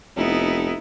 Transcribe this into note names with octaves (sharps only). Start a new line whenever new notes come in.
F1 B3 D#4 E4